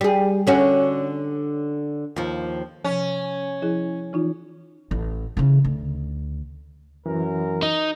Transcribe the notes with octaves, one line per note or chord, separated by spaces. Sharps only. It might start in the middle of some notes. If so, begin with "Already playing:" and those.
G3 G#4
D3 C#4 F#4
D#2 F3
C3 F3 C#4
F3 E4 G#4
E3 D#4 F4
A1
C#3 E3
D2
F#2 E3 A#4
D#4